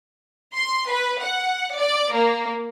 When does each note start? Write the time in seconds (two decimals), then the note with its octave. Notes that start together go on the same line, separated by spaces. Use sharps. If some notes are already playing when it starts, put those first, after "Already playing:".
0.55 C6
0.90 B4
1.22 F#5
1.76 D5
2.14 A#3